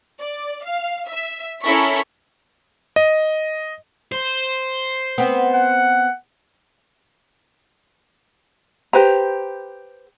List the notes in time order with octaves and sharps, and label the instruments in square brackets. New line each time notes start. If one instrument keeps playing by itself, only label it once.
[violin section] D5
F5
E5
C#4 E4 A4 A#4 C#6 B6
[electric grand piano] D#5
[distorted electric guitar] C5
[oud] B3 C4
[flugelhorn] F#5
[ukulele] G4 B4 C5 A#5